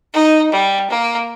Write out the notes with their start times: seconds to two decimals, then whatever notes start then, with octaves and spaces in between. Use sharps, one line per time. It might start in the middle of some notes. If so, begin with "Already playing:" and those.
0.14 D#4
0.52 G3
0.90 A#3